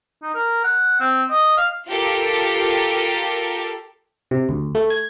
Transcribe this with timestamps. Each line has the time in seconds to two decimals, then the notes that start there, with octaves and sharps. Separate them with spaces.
0.22 D#4
0.35 A#4
0.64 F#5
1.00 C4
1.30 D#5
1.57 F5
1.88 F4 G4 A4 A#4
4.31 C3
4.49 D2
4.75 A3
4.90 G#6